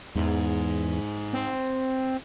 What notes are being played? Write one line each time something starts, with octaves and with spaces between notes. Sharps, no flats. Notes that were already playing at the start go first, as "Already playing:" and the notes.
E2 G#2
C4